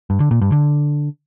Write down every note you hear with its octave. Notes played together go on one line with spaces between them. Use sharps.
G2
D3
A#2
G2
D3